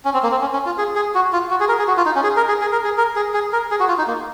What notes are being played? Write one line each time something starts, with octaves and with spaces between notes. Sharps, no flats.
C#4
C4
A#3
C4
C#4
C#4
F4
G#4
G#4
F#4
F4
F#4
G#4
A#4
G#4
F#4
F4
D#4
C#4
G#4
A#4
G#4
G#4
A#4
G#4
A#4
G#4
G#4
A#4
G#4
F#4
F4
D#4
A#3